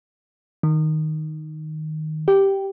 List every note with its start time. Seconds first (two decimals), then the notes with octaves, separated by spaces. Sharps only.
0.63 D#3
2.28 G4